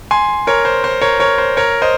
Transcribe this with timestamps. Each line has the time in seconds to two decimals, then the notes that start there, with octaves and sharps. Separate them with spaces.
0.11 G#5 C6
0.47 A#4 C#5
0.65 C5
0.84 C5
1.02 A#4 C#5
1.20 A#4 C#5
1.38 C5
1.57 A#4 C#5
1.82 C5 D#5